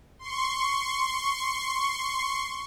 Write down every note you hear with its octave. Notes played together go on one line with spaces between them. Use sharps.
C6 C#6